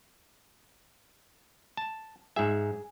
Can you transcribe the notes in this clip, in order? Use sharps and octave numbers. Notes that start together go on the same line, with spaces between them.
A5
G#2 G#4 E5